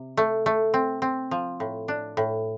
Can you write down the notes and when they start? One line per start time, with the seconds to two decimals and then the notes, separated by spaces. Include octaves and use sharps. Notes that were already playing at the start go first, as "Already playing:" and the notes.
Already playing: C3
0.17 A3
0.46 A3
0.74 C4
1.02 C4
1.31 F3
1.60 A2
1.88 D4
2.17 A2